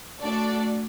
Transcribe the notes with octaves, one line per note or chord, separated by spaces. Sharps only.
A3 D4 F#4 A4 D5